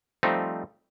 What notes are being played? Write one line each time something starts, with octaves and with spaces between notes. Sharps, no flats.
F3 G3 A3 C4 D#4